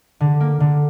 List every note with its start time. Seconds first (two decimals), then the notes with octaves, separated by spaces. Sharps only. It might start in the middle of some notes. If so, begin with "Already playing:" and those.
0.20 D3
0.40 A#3
0.60 D3